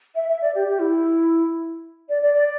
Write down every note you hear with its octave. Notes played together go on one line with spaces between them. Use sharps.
E5
E5
D5
G4
G4
E4
D5
D5
D5